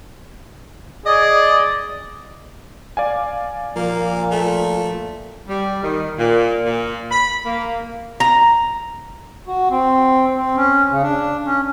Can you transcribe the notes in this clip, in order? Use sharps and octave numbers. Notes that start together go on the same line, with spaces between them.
G#4 D5 D#5
D5 F5 G#5
A#2 F3 A#3
A3
G3
D#3
A#2
A#2
B5
A#3
A#5
F#4
C4
C4
C#4
C#3
D4
C#4